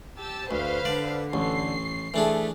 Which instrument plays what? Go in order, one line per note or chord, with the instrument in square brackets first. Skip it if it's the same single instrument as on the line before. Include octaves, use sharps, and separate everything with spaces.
[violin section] G4 A5 E6
[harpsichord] D2 [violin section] B4 C5 F5
[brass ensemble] D3 [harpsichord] D5
[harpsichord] A1 [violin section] C7
[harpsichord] E3 D4 G#4 [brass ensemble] A3